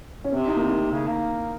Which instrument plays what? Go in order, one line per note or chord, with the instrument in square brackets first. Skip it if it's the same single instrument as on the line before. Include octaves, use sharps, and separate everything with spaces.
[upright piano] C#4
[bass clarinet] C3 [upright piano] C4
[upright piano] D#4
A#3
C4
[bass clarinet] C#3
A#3